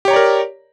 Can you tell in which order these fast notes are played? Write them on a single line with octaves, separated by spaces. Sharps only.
G4 C#5 A#5 D5 A#4